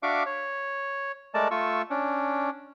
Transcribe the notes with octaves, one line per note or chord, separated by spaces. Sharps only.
D4 F#4 E5 F5 C#6 D6
C#5
G#3 A3 A#4 D5 A5
A3 F4 C#6 E6
C#4 D4